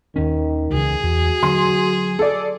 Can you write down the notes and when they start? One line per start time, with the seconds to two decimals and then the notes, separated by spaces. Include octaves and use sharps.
0.16 D#2 D#3 C#4
0.73 C#2 C#3 E3 G#4
1.03 E2 F#4
1.43 D3 F#3 C6
2.19 A4 D5